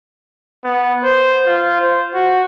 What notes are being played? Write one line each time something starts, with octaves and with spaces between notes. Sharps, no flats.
B3
C5
F4
C5
F#4